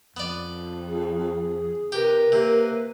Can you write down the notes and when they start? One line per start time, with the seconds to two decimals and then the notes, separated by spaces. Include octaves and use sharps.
0.17 F2 B3 D5
0.86 G#4
1.92 C3 G4 A#4 B4
2.32 C3 A#3